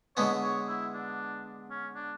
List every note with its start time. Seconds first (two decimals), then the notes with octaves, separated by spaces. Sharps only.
0.16 D3 G#3 B3 C#5
0.43 C#5
0.68 E4
0.94 D4
1.70 C#4
1.95 D4